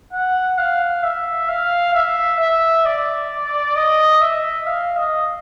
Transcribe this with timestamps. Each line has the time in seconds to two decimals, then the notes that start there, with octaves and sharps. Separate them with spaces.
0.13 F#5
0.58 F5
1.03 E5
1.49 F5
1.94 E5
2.40 E5
2.85 D5
3.76 D#5
4.21 E5
4.67 F5
4.97 D#5